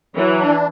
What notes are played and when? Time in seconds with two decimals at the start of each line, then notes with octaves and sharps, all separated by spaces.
0.16 E3 F#3
0.40 D4